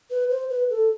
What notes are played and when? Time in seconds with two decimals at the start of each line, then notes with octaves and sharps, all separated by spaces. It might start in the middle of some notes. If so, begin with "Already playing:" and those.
0.10 B4
0.31 C5
0.50 B4
0.70 A4